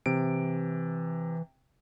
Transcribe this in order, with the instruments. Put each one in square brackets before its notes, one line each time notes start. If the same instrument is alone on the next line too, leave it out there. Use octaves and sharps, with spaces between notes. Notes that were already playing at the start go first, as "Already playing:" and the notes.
[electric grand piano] C3 D7 [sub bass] E3